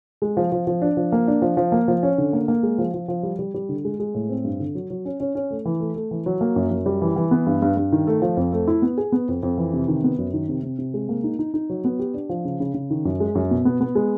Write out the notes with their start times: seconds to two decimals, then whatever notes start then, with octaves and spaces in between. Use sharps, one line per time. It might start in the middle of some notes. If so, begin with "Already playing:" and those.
0.22 G#3
0.37 F3
0.52 F3
0.67 F3
0.82 D4
0.97 F3
1.12 A#3
1.28 D4
1.42 F3
1.57 F3
1.72 A#3
1.88 F3
2.03 C#4
2.18 D3
2.33 A#3
2.48 A#3
2.63 G#3
2.78 F3
2.94 F3
3.08 F3
3.23 G3
3.39 G3
3.54 G3
3.69 D3
3.85 G#3
4.00 G#3
4.14 A2
4.29 C4
4.44 G2
4.60 D3
4.75 F#3
4.90 F#3
5.05 C#4
5.20 C#4
5.35 C#4
5.50 A3
5.65 E3
5.80 A3
5.96 A3
6.11 E3
6.26 F#3
6.41 A#3
6.56 F#2
6.71 F#2
6.86 G3
7.02 E3
7.16 E3
7.31 B3
7.46 G2
7.62 G2
7.77 G2
7.92 D#3
8.07 A3
8.22 F3
8.37 F2
8.52 A3
8.68 E4
8.82 B3
8.98 G#4
9.12 B3
9.28 F2
9.43 F2
9.58 E3
9.73 C3
9.88 D#3
10.04 B3
10.18 F#2
10.33 D#3
10.49 C3
10.63 C3
10.79 C3
10.94 G#3
11.09 A#3
11.24 D#4
11.39 D#4
11.54 D#4
11.70 F#3
11.85 B3
11.99 G4
12.14 D4
12.29 F3
12.45 C#3
12.60 C#3
12.74 C#3
12.90 D#3
13.05 F#2
13.20 G#3
13.35 F#2
13.51 B2
13.65 B3
13.81 B3
13.95 G#3